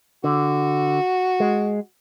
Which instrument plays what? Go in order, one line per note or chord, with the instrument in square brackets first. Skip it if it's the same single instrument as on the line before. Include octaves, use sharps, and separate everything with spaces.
[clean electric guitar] D3 [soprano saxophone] F#4
[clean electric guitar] G#3